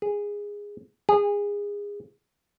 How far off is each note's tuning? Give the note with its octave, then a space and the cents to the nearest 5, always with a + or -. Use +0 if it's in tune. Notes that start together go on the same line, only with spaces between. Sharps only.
G#4 -15
G#4 -25